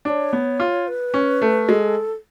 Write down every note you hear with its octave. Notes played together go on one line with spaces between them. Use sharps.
D4 C#5 D5
B3
F4
B4
C#4
A3
G#3 A4